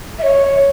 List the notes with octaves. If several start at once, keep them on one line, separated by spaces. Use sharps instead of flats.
E5
C#5